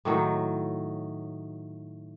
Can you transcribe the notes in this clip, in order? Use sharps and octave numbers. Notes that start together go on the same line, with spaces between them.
A2 D#3 F#3